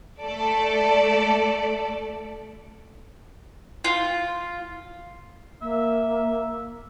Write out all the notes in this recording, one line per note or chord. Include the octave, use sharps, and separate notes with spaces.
A3 A4 D5
F4
A#3 E5